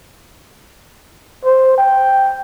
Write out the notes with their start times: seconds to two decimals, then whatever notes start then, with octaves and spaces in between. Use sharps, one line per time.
1.45 C5
1.78 G5